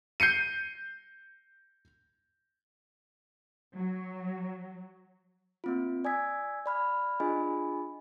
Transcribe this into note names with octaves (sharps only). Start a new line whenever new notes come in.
G6 C7 C#7 D#7
F#3
A#3 C4 F4
D5 G#5 D#6 E6 G#6 B6
D5 B5 F6
D4 F4 G#4 D#5 G#5 B5